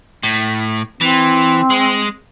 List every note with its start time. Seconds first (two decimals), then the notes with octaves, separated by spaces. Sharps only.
0.23 A2
1.01 E3 C4
1.70 G#3